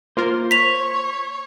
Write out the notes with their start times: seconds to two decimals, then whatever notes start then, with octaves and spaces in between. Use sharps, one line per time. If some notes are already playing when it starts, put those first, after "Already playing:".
0.17 A#3 F4 A#4 C5
0.51 C#5 B6 F7